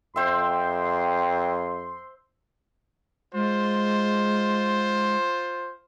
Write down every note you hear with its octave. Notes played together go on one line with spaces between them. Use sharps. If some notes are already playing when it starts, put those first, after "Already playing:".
F2 C5 E5 G5 C6
G#3 F4 C5